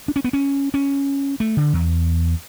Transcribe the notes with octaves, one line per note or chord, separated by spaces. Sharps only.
D4
C#4
B3
C#4
C#4
A3
D3
E2